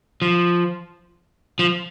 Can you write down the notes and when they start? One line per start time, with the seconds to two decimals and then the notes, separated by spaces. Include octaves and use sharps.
0.22 F3
1.59 F3